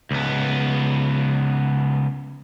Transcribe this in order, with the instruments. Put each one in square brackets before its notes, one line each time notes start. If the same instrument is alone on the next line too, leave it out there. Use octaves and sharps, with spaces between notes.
[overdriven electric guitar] C#2 B3